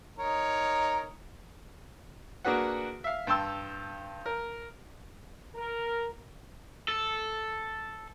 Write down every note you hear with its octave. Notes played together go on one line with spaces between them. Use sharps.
D#4 A#4 C#5
A#3 D4 F#4 G#4 B4 F#5
E5 F5
G2 G5 A5 C6 E6
A#4
A#4
A4